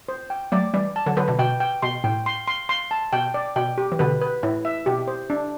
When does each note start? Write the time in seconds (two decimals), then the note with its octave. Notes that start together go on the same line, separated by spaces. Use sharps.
0.09 C5
0.30 G5
0.52 F#3 A3 D5
0.74 E3 G3 D5
0.96 A5
1.06 D3 F#3
1.17 D3 F#3 B4
1.28 B2 D3
1.39 B2 G5
1.60 G5
1.82 B2 C6
2.04 A2 G5
2.26 C6
2.48 C6
2.69 C6
2.91 A5
3.13 B2 G5
3.34 D5
3.56 B2 G5
3.78 G4
3.92 E3
3.99 B2 D3 B4
4.21 B4
4.43 A2 E4
4.65 E5
4.86 B2 G4
5.08 C5
5.30 D4